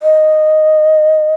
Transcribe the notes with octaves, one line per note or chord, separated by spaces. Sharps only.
D#5